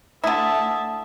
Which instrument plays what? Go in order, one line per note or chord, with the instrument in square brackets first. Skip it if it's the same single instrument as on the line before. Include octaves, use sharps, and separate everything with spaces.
[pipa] D3 E4 [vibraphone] A3 D#6 [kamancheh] E5 A5